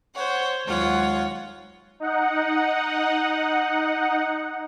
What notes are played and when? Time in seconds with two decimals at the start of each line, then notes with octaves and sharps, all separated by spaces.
0.14 C5 C#5 F#5
0.66 D#2 F#3 G#3 F4 C#5 F#5
2.00 D#4 F#5